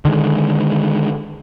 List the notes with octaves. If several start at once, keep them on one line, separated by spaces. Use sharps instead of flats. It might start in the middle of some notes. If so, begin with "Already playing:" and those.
D3 D#3 G#3